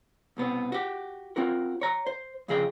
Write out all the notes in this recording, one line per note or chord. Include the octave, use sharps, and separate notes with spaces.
C2 B2 B3 C4
F#4 G4
C4 F4 F#4 A#4
C#5 A#5
C5
F2 C#3 G#4 D#5 G5